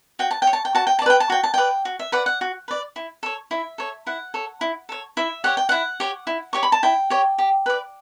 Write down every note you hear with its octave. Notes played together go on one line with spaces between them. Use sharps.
F#4 G5
A5
G5
C#5
A5
G5
F#4 A5
G5
D5 A5
B4 G5
A5
F#4 G5
A5
B4 D5 G5
F#4
E5
B4 D5 F#5
F#5
F#4
B4 D5
E4
A4 C#5
E4 E5
A4 C#5
E4 F#5
A4 C#5
E4
A4 C#5
E4 E5
G4 C#5 F#5
G5
E4 F#5
G4 C#5
E4
G4 C#5 C#6
B5
A5
E4 G5
G4 C#5
G4
B4 D5